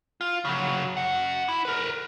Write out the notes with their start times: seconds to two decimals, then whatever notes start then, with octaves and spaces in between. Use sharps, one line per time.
0.21 F4
0.45 C#3 F#3
0.97 C#4 F#5
1.48 E4
1.65 A#4 B4